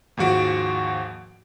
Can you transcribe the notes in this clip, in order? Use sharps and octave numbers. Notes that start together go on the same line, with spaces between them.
D#2 G#2 F3 F#4 D7